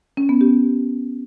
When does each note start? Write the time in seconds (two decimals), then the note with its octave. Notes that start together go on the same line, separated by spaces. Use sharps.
0.17 C#4
0.29 B3
0.41 G4